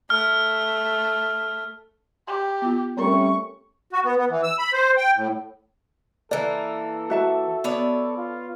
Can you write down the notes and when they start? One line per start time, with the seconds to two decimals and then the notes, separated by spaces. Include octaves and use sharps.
0.10 A3 F6
2.27 G4
2.62 B3 F4
2.98 G3 A3 C4 C#4 A#4 C#6
3.93 F#4
4.05 B3
4.18 B3
4.30 E3
4.43 E6
4.59 B5
4.73 C5
4.97 G5
5.16 A2
6.31 E3 A#3 A4 D5
7.10 F#4 E5 A5
7.64 B3 C#5 D5
8.17 F4